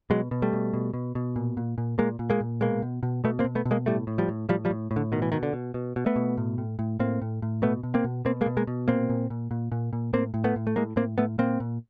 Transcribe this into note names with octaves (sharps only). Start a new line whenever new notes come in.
B2 F#3 G#3
B2
G3 A3
B2
B2
B2
B2
A#2
A#2
A#2
A#2 G#3 A#3
A#2
G#3 A#3
A#2
B2 G#3 A#3
B2
B2
B2 A3 B3
A#3 C4
B2
A3 B3
B2
G#3 A#3
A2 G3 A3
A2
F3 G3
A2
A2 F3 G3
F3 G3
A2
A2
D3
B2 D#3
E3
B2 D#3
D3
B2
B2
B2
A3 B3
B2
A2
A2
A2
A2 A#3 C4
A2
A2
B2 A3 B3
B2
A#3 C4
B2
B2 A#3 C4
G#3 A#3
B2
G#3 A#3
B2
A#2 A#3 C4
A#2
A#2
A#2
A#2
A#2
A2 A#3 C4
A2
A3 B3
A2
A3
A2 G#3 A#3
A2 A#3 C4
A2 A3 B3
A#2 A#3 C4
A#2